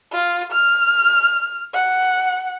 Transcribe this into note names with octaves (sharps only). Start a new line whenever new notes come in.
F4
F6
F#5